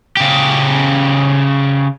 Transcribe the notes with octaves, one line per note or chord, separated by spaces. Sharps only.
C#3 G4